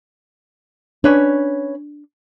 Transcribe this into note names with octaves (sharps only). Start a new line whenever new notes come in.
C#4 D4 B4 C#5